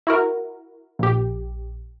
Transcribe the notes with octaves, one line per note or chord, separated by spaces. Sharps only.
E4 F#4 A#4
A#1 G4